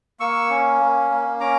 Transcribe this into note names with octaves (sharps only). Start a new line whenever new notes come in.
A#3 C#6 E6
C#4
A#3
A#3
C#4 A#5 D6